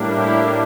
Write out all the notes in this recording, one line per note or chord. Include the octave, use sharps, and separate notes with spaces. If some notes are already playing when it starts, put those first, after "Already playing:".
Already playing: A2 G3 A#3 D4
E4 G4